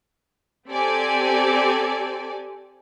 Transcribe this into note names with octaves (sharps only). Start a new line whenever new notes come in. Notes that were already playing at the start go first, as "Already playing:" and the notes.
C4 G4 A4 D5 G#5